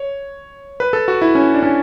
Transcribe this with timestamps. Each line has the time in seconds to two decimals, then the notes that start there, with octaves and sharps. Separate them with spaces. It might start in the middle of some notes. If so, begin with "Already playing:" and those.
Already playing: C#5
0.80 B4
0.93 A4
1.08 F#4
1.22 E4
1.35 C#4
1.54 D4
1.63 C#4